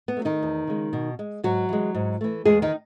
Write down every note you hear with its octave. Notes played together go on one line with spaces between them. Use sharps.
B3
F#3 A3
D#3 D#4
E2
C#3 G#3
B2
G#3
G#2 F#3 F#4
E3 G#3
G#2
E3 A3
E2 G#3 G#4
D#3 D#4